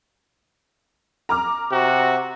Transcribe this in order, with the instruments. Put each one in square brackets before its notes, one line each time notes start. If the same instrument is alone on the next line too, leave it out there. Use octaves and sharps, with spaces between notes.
[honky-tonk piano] A#5 D6 F6
[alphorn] C3 [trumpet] F#4